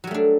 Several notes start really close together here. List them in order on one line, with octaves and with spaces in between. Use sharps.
F#3 G3 A3 D4